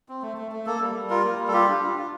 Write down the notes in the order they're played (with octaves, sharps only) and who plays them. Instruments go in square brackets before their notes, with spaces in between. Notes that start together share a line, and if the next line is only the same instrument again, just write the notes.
[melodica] C4
A3
A3
A3
A#3 A4
G3
G3
F4 A#4
A#3
G3
A4
F4 G4
D4
F4
F4